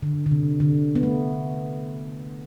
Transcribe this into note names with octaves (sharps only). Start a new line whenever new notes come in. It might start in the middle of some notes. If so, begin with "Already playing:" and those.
D3
D3
C3
D3
B3
A3